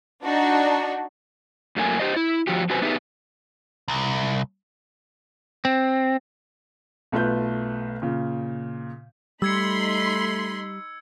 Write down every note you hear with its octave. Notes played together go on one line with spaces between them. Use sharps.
D4 D#4 F#4
F#2 A3 A#3 G#5
G4 C5 D#5
E4
G2 F3 F#4 G4
F#2 C3 F#4 B4 C5 G#5
B3 D#4 G4 G#4 B4 E5
C2
C4
B1 A3 F4 B4 G6
A#2 C#3
G3 A3 D#4 B5 C6 E6 G#6 C#7